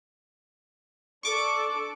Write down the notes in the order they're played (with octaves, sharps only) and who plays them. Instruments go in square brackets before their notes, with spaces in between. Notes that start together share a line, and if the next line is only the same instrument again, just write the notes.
[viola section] D4 A4 D5 [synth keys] C#6 D6